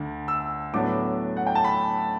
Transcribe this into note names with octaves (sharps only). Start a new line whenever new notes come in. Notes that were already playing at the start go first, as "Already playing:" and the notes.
Already playing: D2 D4
E6
A2 F#3 B3 D4 D6
F#5
G5
A5
B5